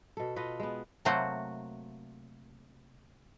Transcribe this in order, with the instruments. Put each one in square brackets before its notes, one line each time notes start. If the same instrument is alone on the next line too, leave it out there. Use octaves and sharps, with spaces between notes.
[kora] B2 A4
F4 A4 B4 D#5
G#3 B3
[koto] C3 F#3 A3 A#3 F#4 C5